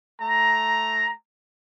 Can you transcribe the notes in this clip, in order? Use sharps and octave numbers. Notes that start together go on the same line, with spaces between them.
A3 A#5